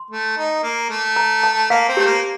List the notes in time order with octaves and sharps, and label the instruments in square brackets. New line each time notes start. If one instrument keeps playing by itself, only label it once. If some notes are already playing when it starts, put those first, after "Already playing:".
Already playing: [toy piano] C6
[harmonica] A3
D#4
A#3
A3
[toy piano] A#5
A5
[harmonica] A#3 [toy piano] F5
[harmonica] C4
[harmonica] A3 [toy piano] G4
[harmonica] A#3